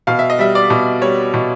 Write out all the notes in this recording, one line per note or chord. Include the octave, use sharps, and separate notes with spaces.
B2 F5
E5
D#5
G3 E5
D5
B2
G3 C#5
B2